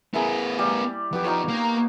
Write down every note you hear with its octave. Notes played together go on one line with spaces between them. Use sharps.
B3 E4 G#4 A#4
G3
F2 B3 G4
D#4 F4 C#5
A#3